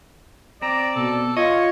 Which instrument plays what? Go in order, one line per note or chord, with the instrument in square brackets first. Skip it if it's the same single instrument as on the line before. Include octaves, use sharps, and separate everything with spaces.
[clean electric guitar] C4 [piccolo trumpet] D5 [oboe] A#5
[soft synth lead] B2 [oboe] A4
[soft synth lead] F4 [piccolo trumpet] C#5 [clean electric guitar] D#5 [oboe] C#6